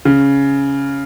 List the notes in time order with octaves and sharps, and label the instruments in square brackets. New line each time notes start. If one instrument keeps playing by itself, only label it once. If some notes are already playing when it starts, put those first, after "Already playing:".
[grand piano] C#3